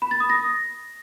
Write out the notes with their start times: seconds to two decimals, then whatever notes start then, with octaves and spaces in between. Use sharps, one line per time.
0.02 B5
0.11 A6
0.20 D#6
0.30 A#6